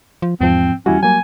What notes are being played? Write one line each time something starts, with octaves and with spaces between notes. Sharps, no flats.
F3
E2 G#2 F3 C4
E2 G3 C#4 E4 F#4
F#3 A#3 G#5